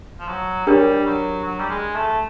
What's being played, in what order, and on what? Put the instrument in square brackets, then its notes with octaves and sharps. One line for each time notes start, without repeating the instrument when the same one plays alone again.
[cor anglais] F3
F#3
[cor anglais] G3 [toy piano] D4 G4 A#4 C#5
[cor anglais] F#3
F#3
G3
G#3
A3